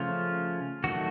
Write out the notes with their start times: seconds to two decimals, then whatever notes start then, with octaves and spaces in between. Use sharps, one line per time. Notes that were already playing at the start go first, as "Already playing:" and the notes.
Already playing: C#3 F3 A3 C#4 F4
0.84 D#3 F#3 A3 F#4